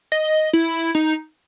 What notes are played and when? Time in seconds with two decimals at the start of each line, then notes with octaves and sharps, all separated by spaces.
0.12 D#5
0.53 E4
0.95 D#4